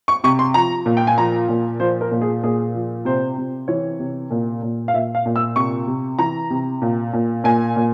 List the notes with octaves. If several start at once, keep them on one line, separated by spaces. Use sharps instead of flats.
C#6
C3 C#6
C6
F3 A#5
A#2
G5
G#5
F3 A#5
A#2
F3 C5
A#4
A#2
G#4
A#2 G#4
F3
C3 C5
C3
E3 C#5
C3
A#2
A#2
F5
A#2 E5
F5
A#2
E6
C3 C#6
C3
E3 A#5
C3
A#2
A#2
A#2 G#5
A#2